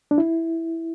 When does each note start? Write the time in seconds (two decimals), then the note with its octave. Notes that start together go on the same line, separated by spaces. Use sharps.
0.11 D4
0.18 E4